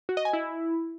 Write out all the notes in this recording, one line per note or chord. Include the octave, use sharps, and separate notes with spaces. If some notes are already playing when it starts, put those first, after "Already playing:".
F#4
D#5
G#5
E4